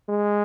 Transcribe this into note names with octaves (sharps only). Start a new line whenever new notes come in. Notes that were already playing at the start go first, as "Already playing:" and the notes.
G#3